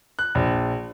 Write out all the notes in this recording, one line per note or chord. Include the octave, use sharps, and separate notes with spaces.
F#6
A#1